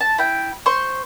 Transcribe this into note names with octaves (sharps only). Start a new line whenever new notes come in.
A5
E4 G5
C5 C6 C#6